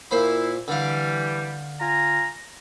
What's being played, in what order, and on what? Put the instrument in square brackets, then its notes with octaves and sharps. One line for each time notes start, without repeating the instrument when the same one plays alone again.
[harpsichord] A#2 C5 B5 [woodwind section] E4
[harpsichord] D3 F5 [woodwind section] E3 G3
[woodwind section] F4 G#5 A#5